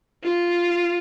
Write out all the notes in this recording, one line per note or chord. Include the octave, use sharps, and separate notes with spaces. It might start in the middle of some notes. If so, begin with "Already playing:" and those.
F4